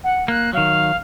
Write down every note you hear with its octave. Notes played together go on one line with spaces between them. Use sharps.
F#5
A#3 F#6
D#3 F#3 F5